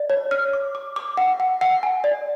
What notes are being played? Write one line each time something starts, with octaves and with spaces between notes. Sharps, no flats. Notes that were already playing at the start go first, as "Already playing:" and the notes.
Already playing: D5
C#5
F6
D6
D6
D6
F#5
F#5
F#5
G#5
D5